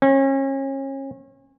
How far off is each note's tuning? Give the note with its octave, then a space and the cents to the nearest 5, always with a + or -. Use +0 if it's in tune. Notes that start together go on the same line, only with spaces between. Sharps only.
C#4 -35